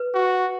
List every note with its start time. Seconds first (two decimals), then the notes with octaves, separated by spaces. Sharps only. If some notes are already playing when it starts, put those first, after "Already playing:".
Already playing: B4
0.15 F#4